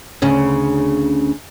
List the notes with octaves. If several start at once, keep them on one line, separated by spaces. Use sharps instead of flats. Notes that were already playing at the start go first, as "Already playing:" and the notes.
D2 C#3 C#4